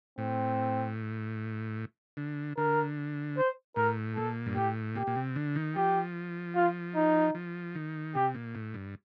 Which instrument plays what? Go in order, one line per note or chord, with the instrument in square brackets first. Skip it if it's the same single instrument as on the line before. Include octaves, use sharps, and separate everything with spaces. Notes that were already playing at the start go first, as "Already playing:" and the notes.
[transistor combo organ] A2 [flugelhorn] C4
[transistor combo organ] D3
[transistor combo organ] D3 [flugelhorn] A#4
[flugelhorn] C5
[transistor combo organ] A2 [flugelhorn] A#4
[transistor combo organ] A#2 [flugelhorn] A4
[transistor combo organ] G2
[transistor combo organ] A2 [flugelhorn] G4
[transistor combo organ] A#2 [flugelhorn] G4
[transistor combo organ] A#2
C3
D3
D#3
[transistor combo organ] F3 [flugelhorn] G4
[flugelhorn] F4
D#4
[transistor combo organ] F3
D#3
[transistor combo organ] C3 [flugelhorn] G4
[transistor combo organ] A#2
A2
G2